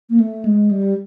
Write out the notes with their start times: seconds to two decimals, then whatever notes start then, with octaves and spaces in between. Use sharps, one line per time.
0.10 A#3
0.20 A3
0.45 G#3
0.71 G3